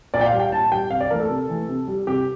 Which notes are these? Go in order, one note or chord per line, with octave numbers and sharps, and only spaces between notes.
A#2 D5
G5
F5
G3
G5
A#2 A5
G3 G5
C3 F5
D5
E3 A3 A#4
A4
C3
E3 A3
C3
G3
C3 G4